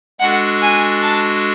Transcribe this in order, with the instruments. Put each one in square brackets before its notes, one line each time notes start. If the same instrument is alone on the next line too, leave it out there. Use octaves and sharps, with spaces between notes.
[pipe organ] G#3 D4 F#4 A4 [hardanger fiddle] F#5
[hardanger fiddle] G#5
A5